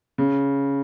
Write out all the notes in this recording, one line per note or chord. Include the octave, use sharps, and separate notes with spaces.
C#3